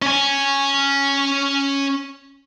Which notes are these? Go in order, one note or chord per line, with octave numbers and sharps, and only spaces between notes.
C#4 G#5